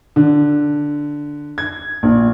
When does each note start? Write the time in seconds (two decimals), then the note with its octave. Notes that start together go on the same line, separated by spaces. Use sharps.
0.16 D3
1.58 G#6
2.03 A#1